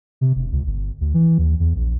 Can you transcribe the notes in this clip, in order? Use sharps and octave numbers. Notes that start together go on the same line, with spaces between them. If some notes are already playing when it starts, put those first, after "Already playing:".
C3
E1
C#2
G1
D2
E3
D#2
E2
A#1